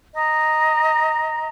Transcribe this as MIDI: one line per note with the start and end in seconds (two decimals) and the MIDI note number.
0.14 1.49 75
0.14 1.49 82